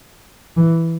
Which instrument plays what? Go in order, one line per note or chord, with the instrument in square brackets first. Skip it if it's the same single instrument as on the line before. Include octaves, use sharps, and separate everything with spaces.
[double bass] E3